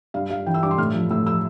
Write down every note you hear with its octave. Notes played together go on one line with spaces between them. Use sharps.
G2 F5
G2 F5
E3 G5
E6
G2 D6
C6
A2 F6
F3
A2 E6
F3 E6